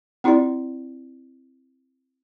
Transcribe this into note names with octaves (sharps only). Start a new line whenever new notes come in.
C4 E4 F4 G4 D5